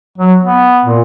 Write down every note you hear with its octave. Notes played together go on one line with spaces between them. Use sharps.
F#3
B3
A#2